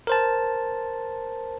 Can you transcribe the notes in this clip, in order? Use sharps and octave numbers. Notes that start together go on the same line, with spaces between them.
A#4 C5 A5